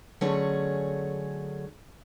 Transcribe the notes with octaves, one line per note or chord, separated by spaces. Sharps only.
D3 F#3 A3 C#4 G#4 C#5